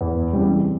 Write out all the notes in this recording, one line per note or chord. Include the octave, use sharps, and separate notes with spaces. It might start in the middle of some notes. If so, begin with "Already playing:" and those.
E2
C#3 E3 G3 C4